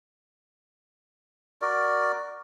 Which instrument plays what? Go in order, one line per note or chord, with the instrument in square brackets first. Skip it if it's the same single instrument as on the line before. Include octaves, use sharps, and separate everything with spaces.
[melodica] F#4 A#4 D5